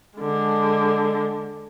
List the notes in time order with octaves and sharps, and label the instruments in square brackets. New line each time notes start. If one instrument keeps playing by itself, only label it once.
[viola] D3 G#3